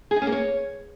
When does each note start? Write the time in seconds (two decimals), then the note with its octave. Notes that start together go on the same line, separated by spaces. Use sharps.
0.11 G#4
0.16 D#4
0.22 C#4
0.27 A#3
0.32 C#5